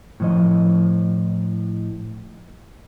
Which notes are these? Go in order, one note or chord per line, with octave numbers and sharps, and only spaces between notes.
A2 F3 D#5